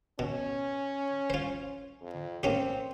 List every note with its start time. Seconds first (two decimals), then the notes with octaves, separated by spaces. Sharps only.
0.19 B2 C#4
1.30 F4 C5
2.01 F2
2.43 A#3 C4 C#4 G4